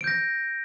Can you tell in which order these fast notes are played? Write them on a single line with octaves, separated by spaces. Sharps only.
D7 G6 A#6